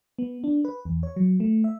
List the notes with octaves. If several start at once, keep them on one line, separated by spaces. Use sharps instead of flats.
B3
D4
B4
E2
C#5
F#3
A3
E5